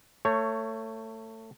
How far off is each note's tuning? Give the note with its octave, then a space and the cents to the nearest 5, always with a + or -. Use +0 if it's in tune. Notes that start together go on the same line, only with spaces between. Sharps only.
A3 +25 C#5 +0